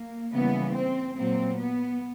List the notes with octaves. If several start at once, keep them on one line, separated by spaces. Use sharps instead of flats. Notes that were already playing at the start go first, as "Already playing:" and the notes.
Already playing: A#3
C#3 E3 G3 A#3 B3
C4
A#2 F#3 A#3 C4
B3